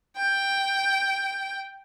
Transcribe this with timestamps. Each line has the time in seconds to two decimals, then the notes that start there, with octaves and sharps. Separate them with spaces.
0.17 G5